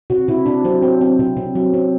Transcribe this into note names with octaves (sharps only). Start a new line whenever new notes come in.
C3 F#4
C3 E4
C3 D4
F#3 C4
C4
C4
C3
C3
F#3
C4